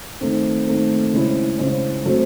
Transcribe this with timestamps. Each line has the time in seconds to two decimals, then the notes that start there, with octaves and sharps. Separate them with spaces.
0.21 D#3 A3 C4
0.67 D#3 A3 C4
1.13 C#3 G#3 C#4 E4 C5
1.59 C#3 G#3 C#4 E4 C5
2.05 F#3 A3 C4 F#4 C5